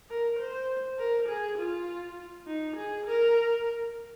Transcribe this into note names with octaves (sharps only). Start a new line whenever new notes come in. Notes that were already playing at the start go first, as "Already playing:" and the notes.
A#4
C5
A#4
G#4
F4
D#4
G#4
A#4